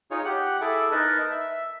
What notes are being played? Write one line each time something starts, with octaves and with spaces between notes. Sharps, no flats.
D#4 F4 G#4 C#5
G4 F#5 F#6
E4 G#4 A4 E5 D6
D#4 A#4 B4 D#5 A5
E5